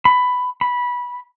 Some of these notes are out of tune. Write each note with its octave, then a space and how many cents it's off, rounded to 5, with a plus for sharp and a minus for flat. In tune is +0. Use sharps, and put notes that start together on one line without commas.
B5 +10
B5 -15